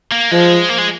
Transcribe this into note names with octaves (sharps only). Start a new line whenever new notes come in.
A#3
F3 G#3
A#3
G#3